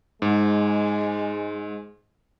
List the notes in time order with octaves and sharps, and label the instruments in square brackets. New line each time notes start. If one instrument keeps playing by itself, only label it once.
[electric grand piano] G#2 [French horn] G#3